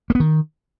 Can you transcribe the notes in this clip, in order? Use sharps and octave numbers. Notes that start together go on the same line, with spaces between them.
A#3
B3
D#3